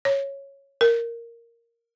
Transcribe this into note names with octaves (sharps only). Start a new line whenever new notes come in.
C#5
A#4